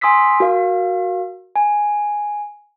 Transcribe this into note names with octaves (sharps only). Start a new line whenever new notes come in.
G#5 C6 D#6 E6 B6 C7
F#4 A#4 F5
G#5